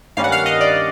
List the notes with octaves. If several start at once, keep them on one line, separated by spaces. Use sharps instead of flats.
G2 D#3 G3 A#3 C#4 F5
F#5
F5
D#5
D5